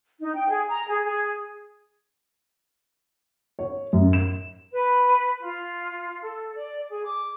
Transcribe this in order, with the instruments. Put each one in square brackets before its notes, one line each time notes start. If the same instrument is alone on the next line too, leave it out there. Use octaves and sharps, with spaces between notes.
[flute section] D#4
G5
G#4
A#5
G#4
G#4
[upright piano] C#5
F#2
E7
[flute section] B4
F4
A4
D5
G#4
D6